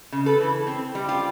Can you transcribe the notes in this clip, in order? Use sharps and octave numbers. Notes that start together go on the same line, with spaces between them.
C#3
A4 B4
E3
C4
G3
F4 G4